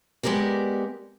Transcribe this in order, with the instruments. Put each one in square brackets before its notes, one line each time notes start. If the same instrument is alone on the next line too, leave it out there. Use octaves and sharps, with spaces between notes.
[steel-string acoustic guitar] G#3 B3 G4 A#4 D5